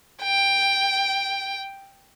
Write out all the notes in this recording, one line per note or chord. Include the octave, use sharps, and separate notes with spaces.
G5